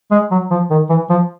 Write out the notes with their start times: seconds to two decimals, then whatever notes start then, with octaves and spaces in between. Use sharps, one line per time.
0.11 G#3
0.31 F#3
0.51 F3
0.70 D#3
0.89 E3
1.10 F3